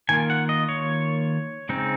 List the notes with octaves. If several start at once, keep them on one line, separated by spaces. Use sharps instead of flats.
D#3 A#3 F4 G#5
F#5
D#5
C#5
C#3 G#3 C4 D#4